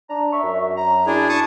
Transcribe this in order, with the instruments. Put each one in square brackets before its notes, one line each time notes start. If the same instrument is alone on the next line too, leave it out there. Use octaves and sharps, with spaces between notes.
[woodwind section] D4 [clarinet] A#5
[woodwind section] D5 A#5 C#6 [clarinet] E5
[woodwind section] F#2
[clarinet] A#5
[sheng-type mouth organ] D4 G#4 [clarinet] E4
[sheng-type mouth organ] A5 C#6 D#6